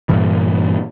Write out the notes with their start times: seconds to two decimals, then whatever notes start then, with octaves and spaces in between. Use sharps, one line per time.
0.09 G2 A#2 E3